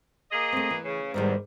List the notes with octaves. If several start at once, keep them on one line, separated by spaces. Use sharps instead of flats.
A#3 G#4 D#5
A3 C4
E3
C#3
E2 G#2 D#3 G3